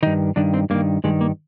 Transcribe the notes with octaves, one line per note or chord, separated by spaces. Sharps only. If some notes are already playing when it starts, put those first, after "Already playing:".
G2 D#3 D#4
G2 D#3 D4
C4
G2 D#3 A#3
G2 D#3 G#3
A#3